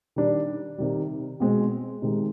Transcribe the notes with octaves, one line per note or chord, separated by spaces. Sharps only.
D#3 G3 D4
C3 D#3 G3
B2 G#3 C4
C3 D#3 G#3